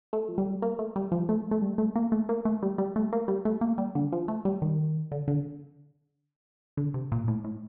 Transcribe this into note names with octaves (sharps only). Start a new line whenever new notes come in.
A3
F3
G3
A#3
A3
G3
F3
A3
A3
G3
A3
A#3
A3
A#3
A3
G3
G3
A3
A#3
G3
A3
A#3
G3
D3
F3
A3
G3
D#3
D3
D3
D3
C3
A#2
A2
A2